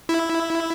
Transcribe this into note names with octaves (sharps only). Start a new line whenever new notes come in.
E4